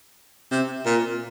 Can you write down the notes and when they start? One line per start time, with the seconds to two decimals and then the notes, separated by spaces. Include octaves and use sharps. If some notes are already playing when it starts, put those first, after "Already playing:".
0.51 C3
0.86 A#2